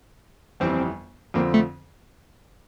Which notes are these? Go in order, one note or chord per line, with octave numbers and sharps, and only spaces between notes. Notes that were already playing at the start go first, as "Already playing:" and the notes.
G1 F2 E3 G3 C4
F2 D3 F3 A#3 C4
A3